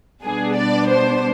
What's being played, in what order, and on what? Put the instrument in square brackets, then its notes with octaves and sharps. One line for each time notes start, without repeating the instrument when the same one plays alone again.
[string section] B2 G3 B3 D4 G#4
D5
C5